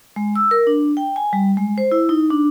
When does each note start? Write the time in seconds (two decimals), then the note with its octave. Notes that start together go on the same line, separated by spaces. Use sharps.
0.16 G#3
0.36 E6
0.51 A#4
0.67 D4
0.97 G5
1.16 G#5
1.33 G3
1.57 G#3
1.78 C5
1.92 E4
2.09 D#4
2.31 D4